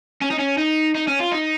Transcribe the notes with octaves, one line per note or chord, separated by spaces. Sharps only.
C#4
D#4
C#4
D#4
D#4
C#4
F4
D#4